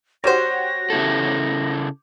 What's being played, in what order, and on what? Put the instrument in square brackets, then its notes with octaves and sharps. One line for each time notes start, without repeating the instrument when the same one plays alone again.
[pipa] G3 C5 [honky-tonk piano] F#4 G4 C#5 [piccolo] A#6
[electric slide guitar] C#3 E4 A4